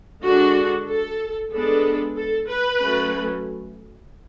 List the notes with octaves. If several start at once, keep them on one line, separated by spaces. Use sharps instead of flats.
D3 G#3 D4 F#4
A4
G#3 B3 D4 A4
A4
B4
F#3 A3 C#4